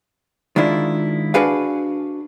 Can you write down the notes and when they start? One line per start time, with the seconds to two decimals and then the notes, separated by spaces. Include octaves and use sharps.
0.56 D#3 G#3 D4 E4 F4
1.34 D4 F#4 G#4 B4 F5